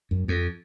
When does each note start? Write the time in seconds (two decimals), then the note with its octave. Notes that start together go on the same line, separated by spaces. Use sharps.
0.11 F#2
0.28 F2